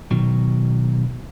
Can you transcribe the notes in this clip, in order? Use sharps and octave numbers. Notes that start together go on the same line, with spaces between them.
B2 D#3 F#3